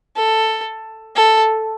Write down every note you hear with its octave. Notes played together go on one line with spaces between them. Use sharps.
A4
A4